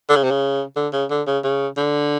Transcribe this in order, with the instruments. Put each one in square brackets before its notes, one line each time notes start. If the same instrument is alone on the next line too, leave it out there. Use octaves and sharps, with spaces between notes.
[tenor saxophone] D3
C#3
C3
C#3
D3
C#3
D3
C#3
C#3
D3